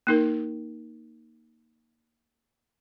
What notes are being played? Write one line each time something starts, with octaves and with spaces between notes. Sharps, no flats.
A#3 D#4 A#4